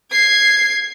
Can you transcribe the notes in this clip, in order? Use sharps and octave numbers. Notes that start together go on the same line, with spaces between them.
G#6 C7